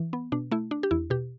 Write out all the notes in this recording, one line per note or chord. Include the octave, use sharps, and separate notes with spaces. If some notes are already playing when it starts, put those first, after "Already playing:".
Already playing: E3
B3
B2 D4
A3 E4
D4
G4
E2 E4
B2 G4